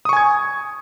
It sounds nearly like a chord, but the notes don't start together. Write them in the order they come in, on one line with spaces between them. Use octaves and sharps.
D#6 C#6 G#5 G#6